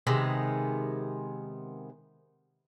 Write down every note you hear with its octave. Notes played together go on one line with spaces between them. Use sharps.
C3 D#3 G#3 B3